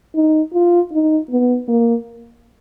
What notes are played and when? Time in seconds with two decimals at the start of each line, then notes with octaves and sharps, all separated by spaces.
0.15 D#4
0.54 F4
0.92 D#4
1.30 B3
1.68 A#3